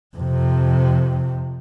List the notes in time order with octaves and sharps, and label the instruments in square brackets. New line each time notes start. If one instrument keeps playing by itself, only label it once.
[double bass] F2 C3